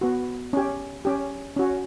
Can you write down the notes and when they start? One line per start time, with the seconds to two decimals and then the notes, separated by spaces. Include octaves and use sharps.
0.01 B3 F#4
0.53 C#4 G4
1.05 C#4 G4
1.56 C#4 F#4